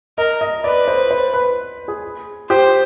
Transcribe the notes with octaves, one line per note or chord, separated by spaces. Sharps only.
A#4 D#5
D#5
B4 D5
C5
C5
B4
G#4
G4 C5